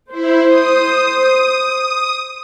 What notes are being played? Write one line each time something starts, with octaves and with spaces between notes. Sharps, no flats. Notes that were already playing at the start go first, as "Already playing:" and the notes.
E4 C5
D#6